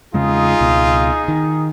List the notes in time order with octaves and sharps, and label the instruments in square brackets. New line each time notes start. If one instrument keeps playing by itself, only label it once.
[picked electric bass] E2 C#3 G#3 [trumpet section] D#4 G#4 [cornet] F4
[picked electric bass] C#2 B2
D#3